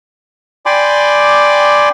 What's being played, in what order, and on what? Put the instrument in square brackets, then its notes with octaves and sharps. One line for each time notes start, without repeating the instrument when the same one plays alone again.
[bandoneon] D5 G5 G#5 B5 C6 D6